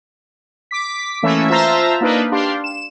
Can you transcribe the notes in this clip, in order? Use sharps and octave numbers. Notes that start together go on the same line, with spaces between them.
D6 B6
E3 A3 A#3 C#4 E5
F4 C5 E5 A5 A#5 E6
A#3 D4 D#4 B4
D4 G4 F5 C6
E7